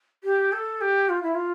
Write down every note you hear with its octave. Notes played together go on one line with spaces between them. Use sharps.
G4
A4
G4
F4
E4
F4